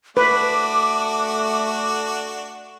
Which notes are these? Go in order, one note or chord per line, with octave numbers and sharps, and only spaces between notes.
A3 D4 F#4 B4 D6